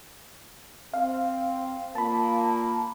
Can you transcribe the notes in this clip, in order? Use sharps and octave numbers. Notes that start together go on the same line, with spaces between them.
C4 F5
A#2 A#3 A5 B5